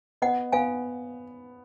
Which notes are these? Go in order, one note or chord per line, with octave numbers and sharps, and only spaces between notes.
B3 D#5 F#5
B3 F5 G#5